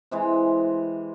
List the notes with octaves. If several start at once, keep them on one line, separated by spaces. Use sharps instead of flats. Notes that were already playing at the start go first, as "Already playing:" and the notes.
C3 E3 G#3